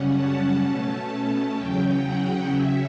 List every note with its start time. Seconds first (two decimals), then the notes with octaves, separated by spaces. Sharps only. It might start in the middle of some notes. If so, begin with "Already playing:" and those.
Already playing: F#2 C#3 G3 C#4 F#5
0.13 A5
0.61 B2 A3 C#4
1.55 E2 C#3 F#3 C#4 G5
2.03 F#5
2.50 C#3 F#3 C#4 E5